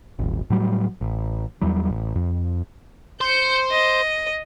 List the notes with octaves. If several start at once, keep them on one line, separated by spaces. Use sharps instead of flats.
D#1 G#1
A2 F#3 G3
A1
E2 E3 F#3 G3
A1
F2
C5 G6 C#7
D#5